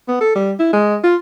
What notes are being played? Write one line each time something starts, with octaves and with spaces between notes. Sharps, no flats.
B3
A4
G3
E4
G#3
F4